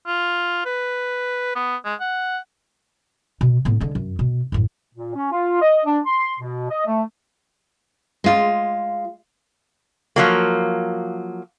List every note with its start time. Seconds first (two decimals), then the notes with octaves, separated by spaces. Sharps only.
0.06 F4
0.65 B4
1.56 B3
1.85 G#3
2.00 F#5
3.41 B2
3.65 A2 B3
3.80 D3 G#3
3.95 F#2
4.19 B2
4.52 A1 F#2
4.95 A#2
5.14 C#4
5.32 F4
5.62 D#5
5.85 D4
6.06 C6
6.40 B2
6.70 D#5
6.86 A3
8.24 G#3 F4
10.16 F3 F#3 A#3